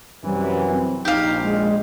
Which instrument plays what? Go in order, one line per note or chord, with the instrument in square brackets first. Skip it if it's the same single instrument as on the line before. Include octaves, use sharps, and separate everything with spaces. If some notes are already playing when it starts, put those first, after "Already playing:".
[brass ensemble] F#2 C3 E3 [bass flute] G3
[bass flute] C4
[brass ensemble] A#1 [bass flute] D#4 [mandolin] G4 F5
[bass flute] G#3